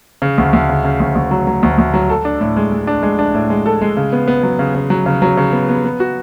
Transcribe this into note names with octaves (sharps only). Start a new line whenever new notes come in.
C#3
D2
D2
C#3
C#3
D2
D2
F#3
F#3
D2
D2
F#3
A4
D4
A2
G#3
G#3
D4
G#3
D4
A2
G#3
A4
G#3
C#3
B3
B3
F#3
C#3
C#3
F#3
C#3
F#3
C#3
B3
B3
B3
F#4